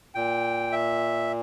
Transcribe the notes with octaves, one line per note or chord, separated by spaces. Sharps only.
A#2 G5
E5